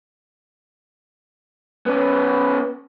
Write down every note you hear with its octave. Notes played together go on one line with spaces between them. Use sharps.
B3 C#4